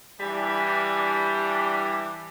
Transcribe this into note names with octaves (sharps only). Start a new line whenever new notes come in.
E3 G3 D4